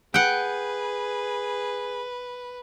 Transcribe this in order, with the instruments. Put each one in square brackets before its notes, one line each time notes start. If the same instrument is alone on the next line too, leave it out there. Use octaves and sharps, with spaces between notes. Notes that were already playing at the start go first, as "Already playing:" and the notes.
[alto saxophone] G#4 [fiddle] B4 [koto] F#5 G5